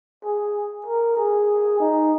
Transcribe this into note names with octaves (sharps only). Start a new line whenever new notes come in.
G#4
A#4
G#4
D#4